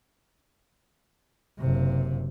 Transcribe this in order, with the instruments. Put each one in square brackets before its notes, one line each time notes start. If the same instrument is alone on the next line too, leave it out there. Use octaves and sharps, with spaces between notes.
[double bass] F#1 C3